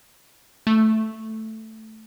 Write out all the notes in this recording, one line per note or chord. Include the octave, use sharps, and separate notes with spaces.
A3